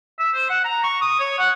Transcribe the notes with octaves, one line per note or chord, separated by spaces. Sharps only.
E5
C5
F#5
A#5
C#6
D#6
C#5
F#5